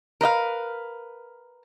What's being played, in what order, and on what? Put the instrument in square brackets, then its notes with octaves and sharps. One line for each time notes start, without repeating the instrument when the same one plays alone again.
[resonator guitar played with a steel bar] A#4 B4 D#5 F5